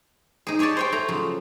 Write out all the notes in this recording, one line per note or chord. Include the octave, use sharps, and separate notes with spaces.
D#4 G#4
G4 G#4 C#5 D5 A5
C5 C#5 G5
A3 A#5
C#3 F3 F#3